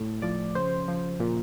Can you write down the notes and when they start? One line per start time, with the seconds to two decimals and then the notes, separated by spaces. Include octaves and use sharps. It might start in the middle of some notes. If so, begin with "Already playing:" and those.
Already playing: A2
0.22 F3 D5
0.55 C#3 C5
0.88 F3
1.20 A#2